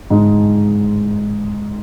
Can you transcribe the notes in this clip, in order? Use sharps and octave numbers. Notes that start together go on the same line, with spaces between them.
G#2 G#3